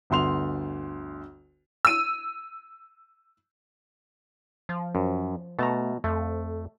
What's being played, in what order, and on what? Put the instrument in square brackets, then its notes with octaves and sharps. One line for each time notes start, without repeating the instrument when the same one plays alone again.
[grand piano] G1 D2 C6 F7
[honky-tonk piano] E6 D#7
[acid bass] F3
[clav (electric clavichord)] F#2
[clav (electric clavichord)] B2 A5 A#5 [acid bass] A3
[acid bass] F2 [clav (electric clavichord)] A3